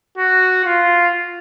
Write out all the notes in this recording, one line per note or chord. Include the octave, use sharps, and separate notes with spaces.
F#4
F4